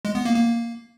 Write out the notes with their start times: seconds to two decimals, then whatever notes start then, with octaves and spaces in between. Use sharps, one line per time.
0.05 G#3
0.15 B3
0.25 A#3
0.36 A#3